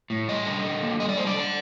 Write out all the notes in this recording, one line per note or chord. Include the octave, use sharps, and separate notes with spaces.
A2
G3 D#5
D3
D3
A#3
G3 D#5
D5
D3 C5
D5
D3